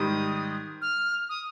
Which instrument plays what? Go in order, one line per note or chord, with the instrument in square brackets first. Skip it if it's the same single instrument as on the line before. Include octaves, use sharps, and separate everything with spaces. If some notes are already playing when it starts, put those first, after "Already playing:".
Already playing: [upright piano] G#2 D#3 G3 [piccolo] D#6
[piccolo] F6
D#6